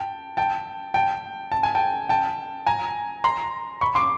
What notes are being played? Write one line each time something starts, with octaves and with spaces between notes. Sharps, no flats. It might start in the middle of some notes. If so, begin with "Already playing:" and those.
Already playing: G5 A5
G5 A5
G5 A5
A5
G#5
G5 A5
G5 A5
G#5 A#5
A#5 C6
B5 C#6
C6 D6